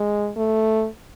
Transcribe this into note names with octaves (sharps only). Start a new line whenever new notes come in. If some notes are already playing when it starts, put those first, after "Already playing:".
Already playing: G#3
A3